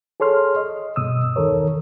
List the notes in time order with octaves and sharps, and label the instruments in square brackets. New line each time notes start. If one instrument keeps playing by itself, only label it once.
[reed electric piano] G#4 A4 C#5 C6 F6
D#5
G2 B2 D#6 E6
E2 D#3 A4 A#4 C#5